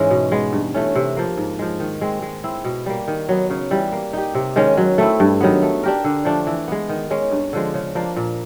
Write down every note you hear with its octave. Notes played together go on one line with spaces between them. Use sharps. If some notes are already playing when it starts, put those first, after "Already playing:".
Already playing: G#2 E3 G#3 C#4
B2
G#3 B3
G2
E3 A3 C#4
C3
F3 A#3
G#2
F3 G#3
D#3
G#3 C4
G#3
C4 E4
B2
G3 A#3
D#3
F#3 B3
C#3
E3 G3
A#3
D#4 G4
C3
D#3 G#3 C#4
F#3
A3 C4 E4
G2
D#3 F#3 B3
A3
D4 G4 A#4
D3
F3 A3 D4
E3
G#3 B3
D#3
G#3 C#4
G2
D3 F3 G#3
C#3
F3 A#3 D4
A#2